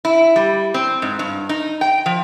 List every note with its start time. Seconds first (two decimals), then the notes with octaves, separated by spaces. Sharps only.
0.05 E4
0.36 G3
0.74 C4
1.02 G#2
1.19 G2
1.49 D#4
1.81 G5
2.06 F3